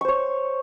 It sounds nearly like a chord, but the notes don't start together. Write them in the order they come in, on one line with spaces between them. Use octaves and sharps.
C#6 C5 C#5